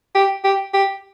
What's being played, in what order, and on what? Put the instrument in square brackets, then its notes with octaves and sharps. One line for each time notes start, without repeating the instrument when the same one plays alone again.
[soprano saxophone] G4
G4
G4